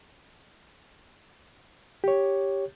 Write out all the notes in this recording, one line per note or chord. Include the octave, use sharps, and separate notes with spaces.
G4 C#5